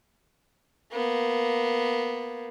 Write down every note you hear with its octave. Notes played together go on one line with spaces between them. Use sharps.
A#3 B3